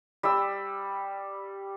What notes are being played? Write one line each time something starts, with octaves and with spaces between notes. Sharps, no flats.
G3 E6